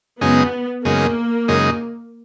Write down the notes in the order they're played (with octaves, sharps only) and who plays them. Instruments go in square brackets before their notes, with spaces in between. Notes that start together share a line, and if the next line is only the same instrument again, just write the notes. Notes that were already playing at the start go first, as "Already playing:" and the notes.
[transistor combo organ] F#2 C#3 G#3 D#4 [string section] B3
[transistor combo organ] F#2 C#3 G#3 D#4 [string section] A#3
[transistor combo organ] F#2 C#3 G#3 D#4